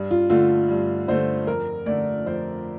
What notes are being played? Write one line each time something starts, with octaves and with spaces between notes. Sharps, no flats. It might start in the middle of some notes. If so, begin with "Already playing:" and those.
Already playing: G2
F4
D3 A3 F4
G2
D3 A3 C5
F2 A#4
D3 A3 D5
F2 C5